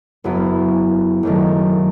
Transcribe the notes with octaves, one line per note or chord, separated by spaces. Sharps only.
F#1 F#2 F#3 B3 E4
F#1 F#2 D#3 A3 D#4